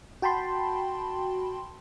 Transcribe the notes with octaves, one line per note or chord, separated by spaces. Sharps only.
F#4 G5 A5 B5 C6